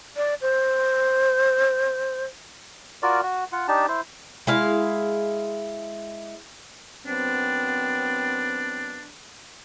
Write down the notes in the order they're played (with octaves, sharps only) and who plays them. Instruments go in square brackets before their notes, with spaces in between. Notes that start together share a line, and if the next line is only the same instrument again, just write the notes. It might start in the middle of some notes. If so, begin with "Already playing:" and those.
[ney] D5
C5
[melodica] F4 F#4 A#4 D5
F#4
F4 F#5
D4 D#4 G4 A5
E4 C5
[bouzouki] G#3 E4 F5
[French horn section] F#2 B3 C4 [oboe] D4